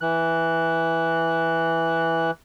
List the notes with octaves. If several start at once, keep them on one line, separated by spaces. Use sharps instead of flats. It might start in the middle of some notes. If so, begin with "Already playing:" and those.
E3 F#6